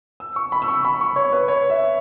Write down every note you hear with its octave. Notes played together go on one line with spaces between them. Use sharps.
E6
C#6
B5
E6
C#6
B5
C#6
C#5
B4
C#5
E5